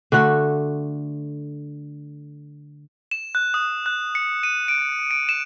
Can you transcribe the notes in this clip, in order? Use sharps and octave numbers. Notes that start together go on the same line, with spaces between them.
D3 A3 F#4 F#5
E7
F#6
D#6
F#6
C#7
D#7
D7
D7
E7